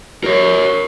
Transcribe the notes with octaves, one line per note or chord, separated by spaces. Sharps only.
A#4 C#5